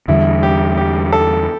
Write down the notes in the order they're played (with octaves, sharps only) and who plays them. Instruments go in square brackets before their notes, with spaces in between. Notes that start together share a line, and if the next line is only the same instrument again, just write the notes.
[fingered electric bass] E2 D3 G3 [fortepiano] E4
[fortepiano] G4
G4
A4